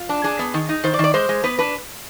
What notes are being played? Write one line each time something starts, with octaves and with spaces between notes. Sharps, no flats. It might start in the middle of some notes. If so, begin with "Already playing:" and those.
Already playing: F4
D4
D4 G#4
B3
D#3
D#4
D#3 C5
D5
D#3
D5
G#3 C5
G#3
B3 B4
D4 B4